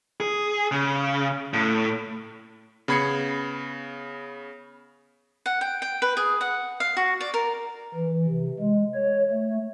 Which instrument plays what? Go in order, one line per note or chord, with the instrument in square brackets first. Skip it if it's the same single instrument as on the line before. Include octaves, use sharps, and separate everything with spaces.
[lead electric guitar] G#4
C#3
A2
[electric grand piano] C#3 B3 B5 G#6 C7 C#7
[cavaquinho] F#5
G5
G5
B4
G#4
F#5
F5
F#4
D5
A#4
[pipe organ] E3
C3
G#3
C#5
A3